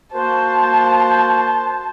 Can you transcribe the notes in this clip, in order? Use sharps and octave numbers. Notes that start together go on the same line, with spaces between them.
A#3 F#4 C5 A5